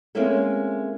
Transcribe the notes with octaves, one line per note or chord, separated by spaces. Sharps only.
G#3 A#3 C4 C#4 E4 A4